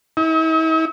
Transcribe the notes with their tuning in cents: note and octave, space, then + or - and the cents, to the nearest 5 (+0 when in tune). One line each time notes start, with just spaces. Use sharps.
E4 -45